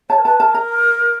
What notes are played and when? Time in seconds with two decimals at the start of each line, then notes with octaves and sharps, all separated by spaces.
0.10 C#5 A5
0.19 A#4
0.25 B4 A5
0.40 A#4 A5
0.54 A#5